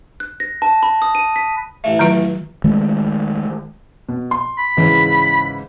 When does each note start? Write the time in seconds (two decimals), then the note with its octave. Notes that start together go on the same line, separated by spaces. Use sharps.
0.20 F#6
0.40 A#6
0.62 A5
0.83 B5
1.02 D#6
1.15 D#7
1.36 B6
1.84 A1 E3 A3
1.99 D#3 F#3 F4
2.64 D#3 G#3 A3
4.09 B2
4.31 C6
4.58 B5
4.77 G#2 C#3 E3